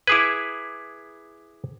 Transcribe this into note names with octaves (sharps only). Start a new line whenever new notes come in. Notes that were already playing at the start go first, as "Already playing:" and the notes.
E4 G#4 B4 D6 D#6 G#6